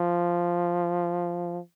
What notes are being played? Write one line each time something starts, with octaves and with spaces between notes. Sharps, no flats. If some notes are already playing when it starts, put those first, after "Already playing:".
Already playing: F3